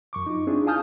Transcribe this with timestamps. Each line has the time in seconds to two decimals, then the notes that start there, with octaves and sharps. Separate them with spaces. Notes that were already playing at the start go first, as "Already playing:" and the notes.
0.13 F#2 C#6 D6
0.26 D#4 F4
0.47 C4 D4 E4 F4 G#4
0.67 F5 G#5 A5 D#6 F6 G6